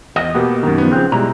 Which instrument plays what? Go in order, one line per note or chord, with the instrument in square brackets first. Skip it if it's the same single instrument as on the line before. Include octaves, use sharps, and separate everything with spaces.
[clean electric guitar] E2 D#5
[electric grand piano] B2 A#3 G4 [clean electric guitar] B3
[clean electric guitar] F#2 D#3
[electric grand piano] F3 B3
[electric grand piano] C#3 F#6 [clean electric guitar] F3 C4
[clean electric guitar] B2 E4 A#5 [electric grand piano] G3 G#3